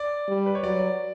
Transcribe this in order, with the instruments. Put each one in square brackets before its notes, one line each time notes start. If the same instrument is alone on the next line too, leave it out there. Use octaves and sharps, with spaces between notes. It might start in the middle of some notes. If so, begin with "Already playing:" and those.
Already playing: [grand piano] D5
[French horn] G3
[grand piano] B4
C#5
[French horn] F#3 [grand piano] D5